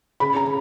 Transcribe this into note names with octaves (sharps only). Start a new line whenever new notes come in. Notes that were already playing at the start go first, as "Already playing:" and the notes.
C#3 B5
A#5
C#3